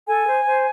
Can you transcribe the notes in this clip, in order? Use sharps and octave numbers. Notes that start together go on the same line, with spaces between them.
A4 G#5
C5
C5